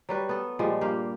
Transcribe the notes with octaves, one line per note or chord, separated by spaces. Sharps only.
F#3 G3 B4
B3 A4
A#2 F3 G3 G#3
G2 A#3 G4 F5